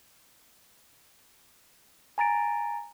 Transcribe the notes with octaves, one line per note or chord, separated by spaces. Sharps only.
G#5 A#5 A6 D7